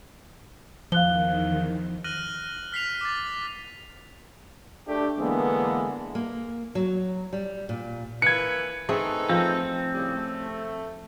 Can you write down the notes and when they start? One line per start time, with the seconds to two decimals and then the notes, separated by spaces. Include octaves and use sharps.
0.92 E2 D#3 F3 F5 F#6 G7
2.04 F6 F#6 A#6 D#7 F#7
2.72 F6 B6 C7 F7
3.01 D6 A6
4.88 A3 D4 G4
5.19 D3 E3 G#3 A#3 B3 A4
6.15 A#3
6.75 F#3
7.33 G3
7.69 A#2
8.22 E3 A#3 B4 G#6 C#7
8.89 A3 C4 D#4 G#4 A4 B4
9.29 F3 C4
9.93 A2 C#3 G3
10.15 A3